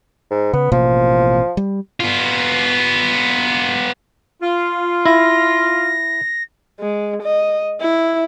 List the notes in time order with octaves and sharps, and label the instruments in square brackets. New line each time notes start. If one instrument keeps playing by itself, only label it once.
[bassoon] G#2
[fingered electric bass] C#3 [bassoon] B3
[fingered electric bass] A1 B2 A#3 [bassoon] F3
[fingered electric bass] G3
[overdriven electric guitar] B3 F4
[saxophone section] F4
[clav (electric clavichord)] E4 [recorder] A#6
[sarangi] G#3
D#5
E4